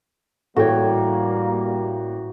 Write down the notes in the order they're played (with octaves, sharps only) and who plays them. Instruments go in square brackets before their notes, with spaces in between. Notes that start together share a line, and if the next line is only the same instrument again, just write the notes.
[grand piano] A1 G5 [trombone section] G3 A#3 [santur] F#4 [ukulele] A4 C#5